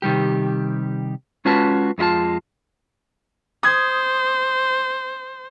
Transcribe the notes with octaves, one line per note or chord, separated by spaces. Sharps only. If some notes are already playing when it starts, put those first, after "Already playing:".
C3 D#3 G3 G4
G#3 C#4 F4 F#4 B4 A5
F2 G#3 E4 F4 A5
C5 D#6 G#6